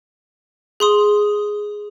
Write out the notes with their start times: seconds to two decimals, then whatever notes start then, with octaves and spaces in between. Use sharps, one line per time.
0.80 G#4 C6 D#6